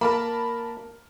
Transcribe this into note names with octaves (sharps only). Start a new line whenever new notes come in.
A#3 A#4 A5 B5